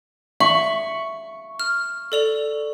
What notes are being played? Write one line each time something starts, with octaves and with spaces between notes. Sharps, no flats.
E5 C#6 F#7
F6
A4 D5 F7